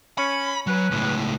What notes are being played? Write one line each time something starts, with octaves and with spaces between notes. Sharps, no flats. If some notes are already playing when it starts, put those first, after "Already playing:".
C#4 B5
F#3 C#4 B4
C#2 A2